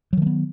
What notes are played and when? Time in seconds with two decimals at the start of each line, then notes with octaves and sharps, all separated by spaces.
0.13 F#3
0.17 D#3
0.22 A3
0.26 B3